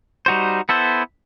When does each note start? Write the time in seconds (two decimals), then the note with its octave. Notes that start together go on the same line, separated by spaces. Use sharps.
0.26 G3 D#4 F#4 C5
0.69 B3 E4 A4 C5